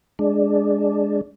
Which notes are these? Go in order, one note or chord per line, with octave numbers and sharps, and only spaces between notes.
G#3 D4